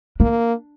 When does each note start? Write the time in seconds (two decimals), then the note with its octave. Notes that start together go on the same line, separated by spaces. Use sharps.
0.20 A#3 D4